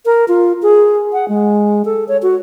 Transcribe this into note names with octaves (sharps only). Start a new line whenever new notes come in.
A#4
F4
G#4
F#5
G#3
A4
C#5
F#4